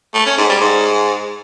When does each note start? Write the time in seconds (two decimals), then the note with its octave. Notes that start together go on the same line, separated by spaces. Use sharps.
0.14 A3
0.26 C#4
0.38 G#2
0.49 G3
0.61 G#2